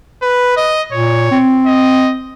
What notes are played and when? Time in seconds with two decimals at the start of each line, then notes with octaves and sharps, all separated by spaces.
0.22 B4
0.57 D#5
0.92 A#2 C#5
1.31 C4
1.66 D#5